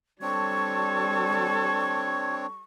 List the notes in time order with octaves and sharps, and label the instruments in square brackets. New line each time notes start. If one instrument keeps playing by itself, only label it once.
[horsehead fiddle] G3 A4 [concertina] C4 D4 C#5 [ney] C#6 [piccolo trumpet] G#6